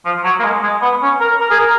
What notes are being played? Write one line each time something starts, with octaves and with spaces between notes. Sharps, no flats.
F3
F#3
A#3
G#3
G#3
B3
C#4
A#4
A#4
G#4
A#4